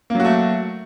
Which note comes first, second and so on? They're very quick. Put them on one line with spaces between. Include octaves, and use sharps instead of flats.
A#3 F#3 F#4 A3